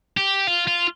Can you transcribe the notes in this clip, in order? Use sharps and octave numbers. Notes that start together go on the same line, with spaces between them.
G4
F4
F4